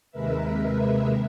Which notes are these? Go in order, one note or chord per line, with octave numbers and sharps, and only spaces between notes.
D#2 C3 G#3 A#4 B4 E5